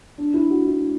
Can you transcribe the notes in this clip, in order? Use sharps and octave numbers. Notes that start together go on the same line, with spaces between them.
D4
E4
F#4
E4